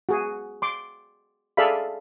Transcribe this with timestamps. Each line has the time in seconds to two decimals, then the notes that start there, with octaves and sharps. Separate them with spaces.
0.09 F#4 G#4
0.62 C6 D6
1.57 G#4 A4 D5 E5 F5 B5